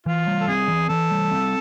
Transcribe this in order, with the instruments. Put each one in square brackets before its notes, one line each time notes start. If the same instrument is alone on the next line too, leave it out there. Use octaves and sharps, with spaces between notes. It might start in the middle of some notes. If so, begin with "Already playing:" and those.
[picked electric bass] E3 [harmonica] F4
[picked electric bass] G3
[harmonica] A4
[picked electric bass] C4 [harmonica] G#4
[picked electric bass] E3
[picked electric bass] E3 [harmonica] A4
[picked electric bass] G3
C4